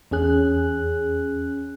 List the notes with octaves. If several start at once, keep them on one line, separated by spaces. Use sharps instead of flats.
E2 C#4 G#4 F#6